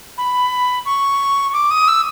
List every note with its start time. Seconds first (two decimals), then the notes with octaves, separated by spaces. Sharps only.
0.18 B5
0.86 C#6
1.53 D6
1.71 D#6
1.88 E6